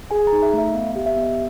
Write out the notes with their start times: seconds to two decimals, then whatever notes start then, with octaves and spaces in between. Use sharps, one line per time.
0.11 G#4 G#5
0.27 A#5
0.32 D#4
0.42 E5
0.53 A3 E5
0.74 B3 F5
0.90 E5
0.96 G4
1.06 E5
1.16 B3
1.22 D#5